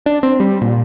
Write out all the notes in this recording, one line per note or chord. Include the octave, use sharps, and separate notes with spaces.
D4
C4
G3
A#2